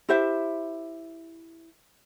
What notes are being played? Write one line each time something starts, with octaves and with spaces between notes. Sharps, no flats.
E4 G4 C5 E5